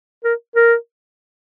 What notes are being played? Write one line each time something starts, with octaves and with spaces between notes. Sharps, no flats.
A#4
A#4